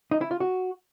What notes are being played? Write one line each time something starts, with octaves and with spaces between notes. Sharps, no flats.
D#4
E4
F4
F#4